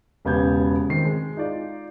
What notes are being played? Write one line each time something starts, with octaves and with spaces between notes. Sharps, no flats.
E1 C#3 B3 G4 G6 G#6
D#3 C4 C7
G#3
D#4 F4 D5